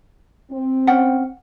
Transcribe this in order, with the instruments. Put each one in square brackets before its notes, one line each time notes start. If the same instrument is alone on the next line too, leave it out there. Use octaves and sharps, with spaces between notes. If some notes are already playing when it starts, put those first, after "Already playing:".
[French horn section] C4
[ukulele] C#4 F#5 G5